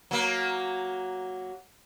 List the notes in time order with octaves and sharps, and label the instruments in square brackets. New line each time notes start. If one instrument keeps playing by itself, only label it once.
[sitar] F#3 A#3